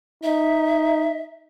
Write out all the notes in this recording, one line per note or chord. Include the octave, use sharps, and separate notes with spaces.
D#4 E5